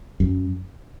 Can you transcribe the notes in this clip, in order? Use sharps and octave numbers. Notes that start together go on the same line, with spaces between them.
F#2